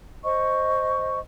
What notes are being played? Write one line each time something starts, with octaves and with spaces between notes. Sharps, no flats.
C5 D#5 C#6